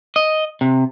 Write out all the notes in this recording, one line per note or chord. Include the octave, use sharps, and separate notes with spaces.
D#5
C3